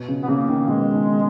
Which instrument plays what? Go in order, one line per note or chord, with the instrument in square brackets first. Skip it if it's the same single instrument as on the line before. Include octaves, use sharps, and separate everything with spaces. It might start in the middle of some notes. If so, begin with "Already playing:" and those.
Already playing: [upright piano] B2
C#3
[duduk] B3
[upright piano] C#3 [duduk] A#3
[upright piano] D#3
[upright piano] B2 [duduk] G#3
[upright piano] D#3